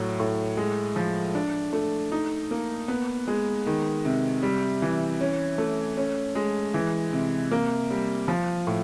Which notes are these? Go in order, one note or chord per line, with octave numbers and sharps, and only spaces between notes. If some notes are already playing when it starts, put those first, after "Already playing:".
Already playing: A2 F#3
A2
G#3
F3
D4
A3
D#4
A#3
B3
G#3
D#3
C3
G3
E3
C#4
A3
C#4
G#3
E3
C3
A#3
G3
F3
A2